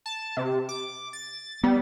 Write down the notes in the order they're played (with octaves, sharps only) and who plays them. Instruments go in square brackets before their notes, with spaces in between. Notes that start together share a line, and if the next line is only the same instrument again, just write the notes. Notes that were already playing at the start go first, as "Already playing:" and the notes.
[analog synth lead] A5
C3
D6
A6
[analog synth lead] G3 [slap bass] B3